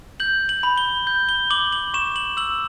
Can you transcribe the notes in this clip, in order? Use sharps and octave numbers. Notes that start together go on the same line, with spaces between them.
G6 F#7
F#7
B5
G7
G6
G7
D6 F#7
F#7
C#6 E7
F#7
E6 F#7